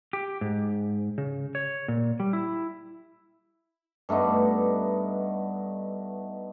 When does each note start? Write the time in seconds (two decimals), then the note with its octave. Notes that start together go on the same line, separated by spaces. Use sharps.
0.13 G4
0.41 G#2
1.18 C#3
1.55 C#5
1.88 A#2
2.20 G3
2.33 E4
4.09 G2 A3 B3 D#4